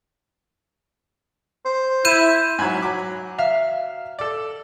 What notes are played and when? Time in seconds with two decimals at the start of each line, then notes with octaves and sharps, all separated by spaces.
1.65 C5
2.05 E4 G6 D#7 E7
2.59 G#2 F#3 G#5 B5 G#6
2.82 F#3 D6
3.38 E5 F5 F6
4.19 A4 D5